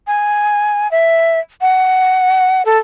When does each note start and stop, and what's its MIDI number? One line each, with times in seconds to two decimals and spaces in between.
0.07 0.90 80
0.91 1.40 76
1.61 2.62 78
2.65 2.78 69